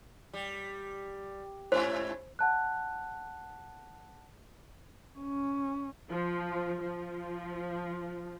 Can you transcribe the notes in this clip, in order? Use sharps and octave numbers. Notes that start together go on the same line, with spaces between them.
G3
G#2 C#4 E4 C5
F#5 A5 F#6
C#4
F3
F3